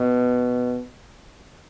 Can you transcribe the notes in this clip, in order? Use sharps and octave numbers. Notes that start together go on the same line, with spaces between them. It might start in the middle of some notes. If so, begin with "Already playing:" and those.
Already playing: B2